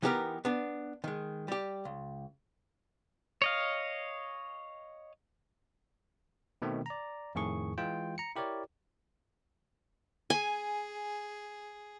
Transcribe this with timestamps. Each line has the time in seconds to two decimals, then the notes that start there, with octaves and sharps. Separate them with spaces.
0.03 E3 B3 D#4 G4 A4 A#4
0.45 B3 D4
1.04 D#3 G#3
1.48 G3 G4
1.85 C#2
3.42 C#5 D#5 F5
6.62 B2 D#3 A3 C4
6.86 D5 A#5
7.35 F2 A2 D#3 G#4 C#6
7.78 E3 G#3 F4 G5
8.18 A#5 C#7
8.36 E4 G4 A#4 C#5 D5
10.30 G#4 G#5